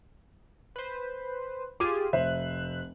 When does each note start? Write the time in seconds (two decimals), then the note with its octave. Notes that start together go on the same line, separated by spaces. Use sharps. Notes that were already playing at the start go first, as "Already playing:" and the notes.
0.76 B4 C5
1.80 F4 G4 G#4 D6 D#7
2.13 F1 C5 E5 F#6